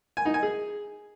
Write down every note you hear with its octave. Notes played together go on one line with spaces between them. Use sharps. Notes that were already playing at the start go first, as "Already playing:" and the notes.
G#5
D#4
G#5
G#4